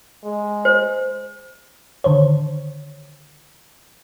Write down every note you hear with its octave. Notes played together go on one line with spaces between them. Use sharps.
G#3
C5
D3 D#3 C5 C#5